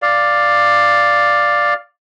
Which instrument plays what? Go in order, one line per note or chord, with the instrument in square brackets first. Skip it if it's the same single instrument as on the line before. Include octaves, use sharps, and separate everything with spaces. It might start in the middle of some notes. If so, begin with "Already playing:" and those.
[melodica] D5 F5